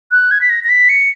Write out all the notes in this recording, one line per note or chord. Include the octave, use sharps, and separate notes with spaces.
F#6
G#6
B6
A#6
A#6
B6
C#7